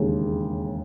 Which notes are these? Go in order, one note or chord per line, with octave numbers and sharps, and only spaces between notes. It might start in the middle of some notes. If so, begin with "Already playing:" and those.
Already playing: E1 D#2 C#3